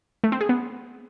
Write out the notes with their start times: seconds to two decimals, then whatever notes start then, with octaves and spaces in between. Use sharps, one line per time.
0.24 A3
0.32 C4
0.41 G#4
0.49 B3